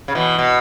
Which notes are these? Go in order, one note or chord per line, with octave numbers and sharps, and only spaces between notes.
C#3
B2 E3
B2